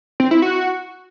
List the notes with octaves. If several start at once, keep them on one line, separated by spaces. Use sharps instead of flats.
C4
E4
F#4